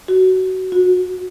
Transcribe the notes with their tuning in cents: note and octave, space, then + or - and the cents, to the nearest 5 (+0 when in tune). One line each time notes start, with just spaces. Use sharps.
F#4 +20
F#4 -25